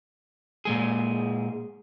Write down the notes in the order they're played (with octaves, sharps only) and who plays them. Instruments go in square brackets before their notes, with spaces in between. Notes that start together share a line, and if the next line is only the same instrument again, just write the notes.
[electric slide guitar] A#2 G#3 G#4